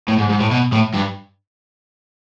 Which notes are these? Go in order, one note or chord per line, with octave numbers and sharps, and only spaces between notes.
A2
G#2
G#2
A2
B2
A2
G2